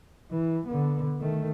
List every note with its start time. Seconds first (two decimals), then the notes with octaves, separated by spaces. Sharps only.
0.31 E3
0.67 D3 B3
1.20 D#3 A3